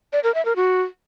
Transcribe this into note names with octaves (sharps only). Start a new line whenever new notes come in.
D5
A#4
E5
A#4
F#4